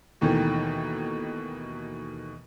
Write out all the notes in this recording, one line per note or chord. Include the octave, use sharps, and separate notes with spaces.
D#2 B2 D#3 E3 A3